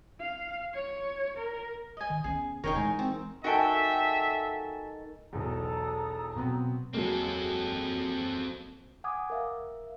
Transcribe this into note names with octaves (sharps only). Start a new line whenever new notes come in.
F5
C#5
A#4
D#5 G#5
D#3
B3 C#4 G#4
D#1 D#3 D#4 G#4 A#4 C#5 G5 C#6
E3 G#3 G#5
C4
D#3 F#4 G#4 A4 E5 G5
E1 B1 E2 A4 A#5 D#6
B2 F#3 B3 C4
F#3 G#3 A#3 C4 A4
F#5 G#5 D6 D#6 G#6
A#4 E5 F5